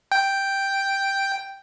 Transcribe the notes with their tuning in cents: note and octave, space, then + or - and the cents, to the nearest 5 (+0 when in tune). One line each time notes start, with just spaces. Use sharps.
G5 +0